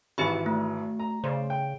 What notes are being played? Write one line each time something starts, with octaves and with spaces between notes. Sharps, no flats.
G#1 E3 F#4 G4 E5 B5
A3
A#5
C#3 C5 D5
G5